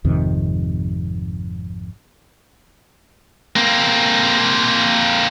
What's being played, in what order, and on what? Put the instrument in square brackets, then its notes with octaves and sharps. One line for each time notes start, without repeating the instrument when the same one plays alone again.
[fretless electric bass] G#1 F2 C3 D#3
[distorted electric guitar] A#3 C4